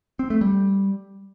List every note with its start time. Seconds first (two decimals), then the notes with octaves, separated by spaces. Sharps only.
0.19 C4
0.30 A3
0.41 G3